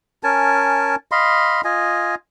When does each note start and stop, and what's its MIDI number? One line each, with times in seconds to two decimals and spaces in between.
0.23 0.96 61
0.23 0.96 70
0.23 0.96 80
0.23 0.96 81
1.12 1.61 75
1.12 1.61 77
1.12 1.61 83
1.12 1.61 84
1.64 2.15 65
1.64 2.15 75
1.64 2.15 80